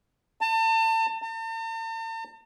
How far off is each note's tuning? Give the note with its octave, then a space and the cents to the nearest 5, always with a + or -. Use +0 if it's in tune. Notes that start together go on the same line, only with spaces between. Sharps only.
A5 +35
A5 +45